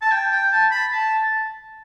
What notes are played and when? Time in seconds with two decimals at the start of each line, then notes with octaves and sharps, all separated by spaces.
0.02 A5
0.12 G5
0.32 G5
0.52 A5
0.71 B5
0.91 A5